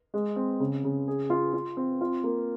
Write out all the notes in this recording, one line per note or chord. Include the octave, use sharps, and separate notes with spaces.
G#3
C4
C#3
C#3
G#4
F4
F4
C4
F4
A#3